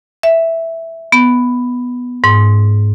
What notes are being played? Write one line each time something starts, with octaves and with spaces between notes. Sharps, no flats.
E5
B3
G#2